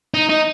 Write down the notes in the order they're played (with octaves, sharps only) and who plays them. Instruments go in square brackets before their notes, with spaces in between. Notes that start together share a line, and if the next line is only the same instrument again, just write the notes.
[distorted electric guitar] D#4
D#4